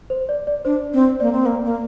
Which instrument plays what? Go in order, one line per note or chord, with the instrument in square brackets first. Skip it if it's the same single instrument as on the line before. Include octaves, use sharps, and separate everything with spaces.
[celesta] C5
D5
D5
[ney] D4 [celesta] C5
[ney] C4
[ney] A#3 [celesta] D5
[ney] C4
A#3
A#3